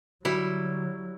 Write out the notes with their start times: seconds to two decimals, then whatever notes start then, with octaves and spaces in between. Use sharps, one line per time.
0.25 D3 F#3 G3 E4 F#4 G5